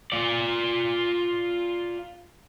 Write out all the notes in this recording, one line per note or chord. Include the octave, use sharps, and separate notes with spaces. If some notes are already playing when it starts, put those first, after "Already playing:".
F4 D5